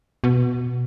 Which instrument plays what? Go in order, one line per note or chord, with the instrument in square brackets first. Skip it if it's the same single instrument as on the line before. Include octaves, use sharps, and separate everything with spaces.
[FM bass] B2